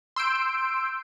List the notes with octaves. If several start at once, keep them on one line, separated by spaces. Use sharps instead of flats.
C6 E6 G6 D7